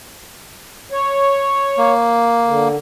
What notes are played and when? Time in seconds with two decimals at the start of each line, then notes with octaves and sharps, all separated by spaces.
0.92 C#5
1.78 A#3
2.46 D3